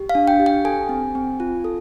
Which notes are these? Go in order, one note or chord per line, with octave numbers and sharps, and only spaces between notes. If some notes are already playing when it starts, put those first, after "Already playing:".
Already playing: G4
F5
D4
G5
G4
G5
A4 G#5
C4
C4
F4
A4